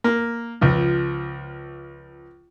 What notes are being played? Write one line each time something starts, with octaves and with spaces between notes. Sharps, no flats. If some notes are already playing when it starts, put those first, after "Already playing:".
A#3
C#2 F3